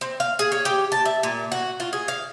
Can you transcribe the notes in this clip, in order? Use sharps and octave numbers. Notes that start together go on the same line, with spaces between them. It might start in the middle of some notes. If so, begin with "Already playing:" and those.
C4
F5
G#4
C#5
G4
A5
E5
A#2
F#4
F4
G#4
F5